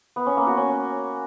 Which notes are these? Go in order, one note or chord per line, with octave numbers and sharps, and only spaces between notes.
B3
C#4
A#3
F#4
C#4